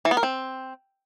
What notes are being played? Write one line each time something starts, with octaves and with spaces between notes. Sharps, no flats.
E3
B3
A#4
C4